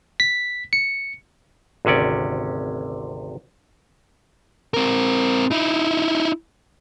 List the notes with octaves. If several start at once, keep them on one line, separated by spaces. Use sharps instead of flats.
B6
C#7
G#1 D2 C3 C#4 D5
C4 A#4
D#4 E4